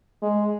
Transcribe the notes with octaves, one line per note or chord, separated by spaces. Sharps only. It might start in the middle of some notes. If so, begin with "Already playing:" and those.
G#3